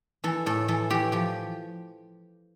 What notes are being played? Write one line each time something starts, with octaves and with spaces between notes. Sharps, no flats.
E3 A4
A2 A4
E3 A4
E3 G4
F3 G4